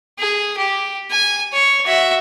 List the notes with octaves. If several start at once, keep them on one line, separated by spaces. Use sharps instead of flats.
G#4
G4
G#5
C#5
F#4 E5